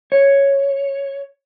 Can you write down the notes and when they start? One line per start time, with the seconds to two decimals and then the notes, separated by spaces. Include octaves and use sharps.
0.12 C#5